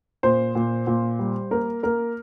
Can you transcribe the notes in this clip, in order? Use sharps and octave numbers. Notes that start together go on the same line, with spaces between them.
A#2 C5
A#2
A#2
G3
A#3 A#4
A#3 A#4